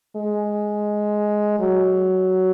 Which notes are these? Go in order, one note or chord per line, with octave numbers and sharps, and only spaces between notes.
G#3
F#3